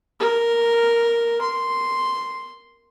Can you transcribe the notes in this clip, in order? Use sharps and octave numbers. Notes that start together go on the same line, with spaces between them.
A#4
C6